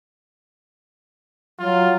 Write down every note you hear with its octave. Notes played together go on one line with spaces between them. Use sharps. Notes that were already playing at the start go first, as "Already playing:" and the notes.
F#3 F4